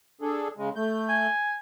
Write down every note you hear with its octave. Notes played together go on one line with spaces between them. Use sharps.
D4 G#4 A4
C#3 G#3
A3 G6
G#5